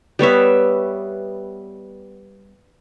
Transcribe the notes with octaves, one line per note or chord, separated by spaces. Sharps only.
G3 B3 C#5 E5